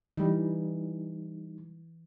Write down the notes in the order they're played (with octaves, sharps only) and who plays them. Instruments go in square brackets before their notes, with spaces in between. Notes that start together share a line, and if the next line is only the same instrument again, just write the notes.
[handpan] E3 [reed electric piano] G3 D#4